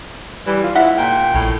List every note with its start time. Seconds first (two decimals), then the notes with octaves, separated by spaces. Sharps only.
0.46 E3 G3
0.64 F4
0.76 G#2 E4 E5 F#5
0.98 A#2 G5
1.35 A#1 A2